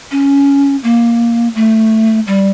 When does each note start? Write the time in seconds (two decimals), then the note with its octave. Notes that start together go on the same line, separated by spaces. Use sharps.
0.11 C#4
0.84 A#3
1.55 A3
2.27 G3